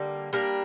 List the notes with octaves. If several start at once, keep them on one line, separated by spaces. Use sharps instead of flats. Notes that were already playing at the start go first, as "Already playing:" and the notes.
Already playing: D3 G3 A#3
G3 A#3 D4 A#4